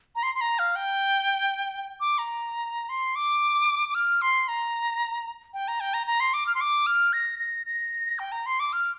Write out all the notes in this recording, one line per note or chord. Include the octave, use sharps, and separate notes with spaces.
A#5
C6
C6
A#5
F5
G5
D6
A#5
C6
D6
D6
F6
C6
A#5
G5
A#5
G5
A#5
A#5
C6
D6
F6
C6
D6
F6
A#6
A#6
A#6
G5
A#5
C6
D6
F6